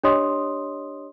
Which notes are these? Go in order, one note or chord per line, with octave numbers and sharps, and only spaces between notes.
D4 G4 C#5 D#5 C6 D#6